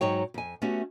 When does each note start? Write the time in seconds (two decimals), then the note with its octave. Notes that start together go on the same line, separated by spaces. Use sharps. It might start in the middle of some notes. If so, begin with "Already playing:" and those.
0.01 G#2 F#3 D#4 C#5 G5
0.34 F2 G#5
0.62 A3 B3 C#4 F#4 G4